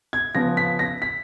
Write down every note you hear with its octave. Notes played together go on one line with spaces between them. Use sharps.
G#6
C#3 F3 B3 A#6
B6
A#6
B6